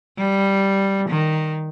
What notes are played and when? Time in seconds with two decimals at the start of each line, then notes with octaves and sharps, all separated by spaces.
0.18 G3
1.09 D#3